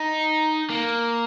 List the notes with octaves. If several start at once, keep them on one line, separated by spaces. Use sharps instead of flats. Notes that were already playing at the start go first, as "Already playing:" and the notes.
Already playing: D#4
A#3